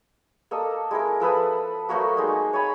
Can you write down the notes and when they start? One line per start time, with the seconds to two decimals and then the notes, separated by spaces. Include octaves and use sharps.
0.51 A#3 A4 D#5
0.91 G#3 E4 A#4
1.20 F3 A4 B4 D#6
1.89 F#3 A3 A#3 F#4
2.17 G#3 D#4
2.53 C#5 G#5 B5